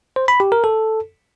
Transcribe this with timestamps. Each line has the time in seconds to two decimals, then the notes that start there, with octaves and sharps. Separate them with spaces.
0.16 C5
0.28 B5
0.40 G4
0.52 A#4
0.64 A4